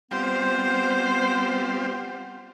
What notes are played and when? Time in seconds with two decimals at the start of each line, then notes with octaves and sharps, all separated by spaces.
0.11 G3 B3 C4 F4 C5